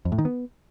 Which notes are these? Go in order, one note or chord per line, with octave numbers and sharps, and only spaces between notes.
F2
A2
D#3
B3